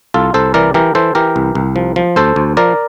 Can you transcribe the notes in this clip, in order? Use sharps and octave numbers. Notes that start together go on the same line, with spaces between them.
C2 F4 A4
C2 A4 C5
E3 A#4 D5
E3 G4 A#4
E3 A4 C5
E3 G4 A#4
C2
C2
F3
F3
D2 A4 C5
D2
F3 A#4 D5